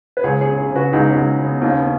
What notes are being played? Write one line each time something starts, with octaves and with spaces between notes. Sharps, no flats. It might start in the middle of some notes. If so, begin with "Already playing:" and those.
B4
C#2 G#4 C#5
G#4 C#5
C#3
G#4 C#5
C#3 G#4
F#4 B4
C#2 D#4 G#4
C#4 F#4
C#2
C#3
B3
D#2 D#4
C#4
B3
C#4